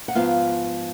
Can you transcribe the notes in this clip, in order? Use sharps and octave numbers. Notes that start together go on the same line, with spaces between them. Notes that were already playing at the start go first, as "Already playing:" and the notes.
F#5
G#2 F3 B3 F4 F5